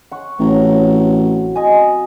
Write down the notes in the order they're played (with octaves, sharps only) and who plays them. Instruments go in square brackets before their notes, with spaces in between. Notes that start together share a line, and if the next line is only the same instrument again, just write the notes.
[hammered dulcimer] F#5 C#6
[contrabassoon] A1 [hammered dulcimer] C3 F#3
[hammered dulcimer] D#5 G#5